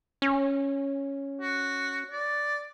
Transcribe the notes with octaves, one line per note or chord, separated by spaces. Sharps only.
C#4
F#4
D5